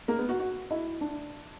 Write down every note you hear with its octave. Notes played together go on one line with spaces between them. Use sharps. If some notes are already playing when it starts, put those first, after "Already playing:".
A#3
B3
F#4
F#4
E4
D4